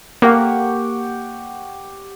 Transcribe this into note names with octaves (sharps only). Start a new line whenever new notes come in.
A#3 G4 F#5 C#6